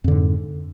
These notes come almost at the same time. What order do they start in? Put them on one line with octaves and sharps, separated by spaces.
F2 D3 G#2